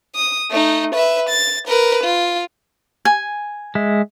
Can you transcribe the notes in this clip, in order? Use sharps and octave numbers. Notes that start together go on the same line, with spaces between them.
D#6
A3 D#4
B4 E5
A6
A#4 B4
F4
G#5
G#3 E5